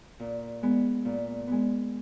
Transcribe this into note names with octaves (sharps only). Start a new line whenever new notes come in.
A#2
G#3 B3
A#2
G#3 B3